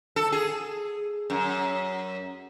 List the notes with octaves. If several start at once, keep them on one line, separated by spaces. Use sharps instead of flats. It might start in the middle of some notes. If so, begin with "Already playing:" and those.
A4
G#4
F#2